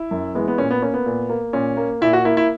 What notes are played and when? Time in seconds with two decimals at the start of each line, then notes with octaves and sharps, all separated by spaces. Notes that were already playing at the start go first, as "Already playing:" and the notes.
Already playing: E4
0.11 F#2
0.35 E3 G#3 B3
0.48 B3
0.58 A#2 C#4
0.71 B3
0.82 A#3 C#4
0.94 B3
1.06 A#2
1.30 A#3
1.53 A#2 C#4
1.77 A#3
2.01 A#2 E4
2.13 F#4
2.25 A#3 E4
2.37 E4